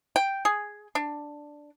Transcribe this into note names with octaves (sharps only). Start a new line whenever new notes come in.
G5
G#4
D4